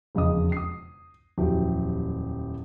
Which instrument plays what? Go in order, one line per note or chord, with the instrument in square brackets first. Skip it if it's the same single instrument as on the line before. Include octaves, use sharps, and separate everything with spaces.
[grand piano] E1 F2 C#3 D#5 D#6
D#6 C7
D#1 F2 F#3 E4 G4